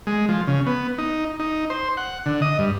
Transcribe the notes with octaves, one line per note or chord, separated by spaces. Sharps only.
G#3
F3
C#3
B3
D#4
D#4
C5
F#5
D3
D#5
G2